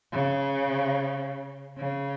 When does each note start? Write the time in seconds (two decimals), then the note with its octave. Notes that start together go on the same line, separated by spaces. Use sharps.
0.12 C#3
1.77 C#3